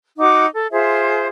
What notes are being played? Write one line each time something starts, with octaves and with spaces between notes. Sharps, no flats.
D#4 F#4 F#5 D6
A4
F4 G#4 C5 E5